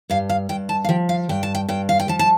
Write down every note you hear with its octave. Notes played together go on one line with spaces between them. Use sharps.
G2 F5
F5
G2 G5
A5
F5
F3 G5
F5
G2 G5
A5
G5
G2 G5
F5
G5
F3 A5
A5